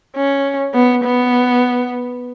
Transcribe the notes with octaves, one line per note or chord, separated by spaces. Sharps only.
C#4
B3
B3